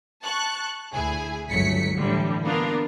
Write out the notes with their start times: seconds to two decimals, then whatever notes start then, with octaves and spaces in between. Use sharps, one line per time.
0.24 A5 C#6 F#6
0.92 D2 E4 G#4 G#5
1.49 G1 C#2 F#3 A3 B6 C#7
1.96 A2 D3 E3 G3
2.45 A#3 B3 D4 F4 A#4